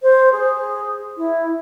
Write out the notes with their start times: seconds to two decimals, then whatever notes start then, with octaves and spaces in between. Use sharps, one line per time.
0.02 C5
0.32 G#4
1.17 E4